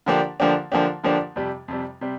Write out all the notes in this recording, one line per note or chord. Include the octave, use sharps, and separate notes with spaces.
D3 F3 A#3 D4 G4
D3 F3 A#3 D4 G4
D3 F3 A#3 D4 G4
D3 F3 A#3 D4 G4
F2 C3 G3
F2 C3 G3
C3 G3